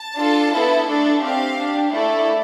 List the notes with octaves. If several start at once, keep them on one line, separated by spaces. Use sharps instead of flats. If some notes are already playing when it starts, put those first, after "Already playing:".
Already playing: A5
D4 F4 A4
B3 E4 A4
A3 D4 A4
C4 G4 F5
D4 G4
A3 E4 A4 D5